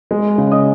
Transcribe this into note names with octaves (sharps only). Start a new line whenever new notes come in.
G#3
C#3
D#5 D#6